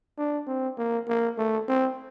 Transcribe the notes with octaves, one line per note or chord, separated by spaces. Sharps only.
D4
C4
A#3
A#3
A3
C4